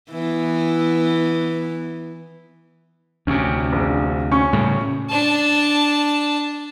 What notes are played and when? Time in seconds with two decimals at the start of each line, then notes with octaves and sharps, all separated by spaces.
0.11 E3 B3
3.27 D2 C3 C#4
3.73 A#1
4.31 C#4 C#6
4.53 A2 C#3 G3
5.10 D4 A5